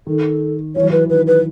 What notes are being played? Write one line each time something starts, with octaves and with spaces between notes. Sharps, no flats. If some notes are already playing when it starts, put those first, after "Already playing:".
D#3 A4
E3 C#5
F#3
E3 B4
D#3 B4
B4